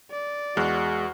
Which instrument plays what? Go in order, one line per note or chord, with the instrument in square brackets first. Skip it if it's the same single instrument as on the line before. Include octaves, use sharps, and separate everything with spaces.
[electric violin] D5
[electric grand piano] E2 F6 F#6 [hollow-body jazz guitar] G#3 [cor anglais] F#4